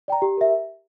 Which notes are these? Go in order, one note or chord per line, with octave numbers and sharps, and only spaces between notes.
D5 G5 A#5
G4
A#4 E5